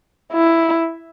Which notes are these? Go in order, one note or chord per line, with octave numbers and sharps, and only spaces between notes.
E4